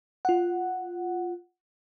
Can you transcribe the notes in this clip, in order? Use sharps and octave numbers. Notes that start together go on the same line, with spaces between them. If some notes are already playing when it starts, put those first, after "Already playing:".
F4 F#5